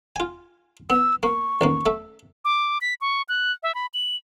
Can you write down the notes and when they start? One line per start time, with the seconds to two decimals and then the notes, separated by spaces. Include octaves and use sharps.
0.16 F4 G#5
0.90 B3 E6
1.23 A#3 C#6
1.61 A1 D#2 A#3
1.86 A3 E5
2.45 D6
2.81 B6
3.01 C#6
3.29 F#6
3.63 E5
3.75 B5
3.94 F#7